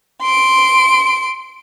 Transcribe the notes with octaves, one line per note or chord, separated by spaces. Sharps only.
C6 D7